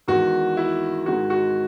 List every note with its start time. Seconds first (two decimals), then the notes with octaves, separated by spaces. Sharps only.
0.08 E2 D#3 G#3 F#4
0.57 E4
1.06 G#2 D#3 G#3 F#4
1.30 F#4